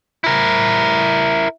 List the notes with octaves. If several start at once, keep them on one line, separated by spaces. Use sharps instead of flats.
E4 A#4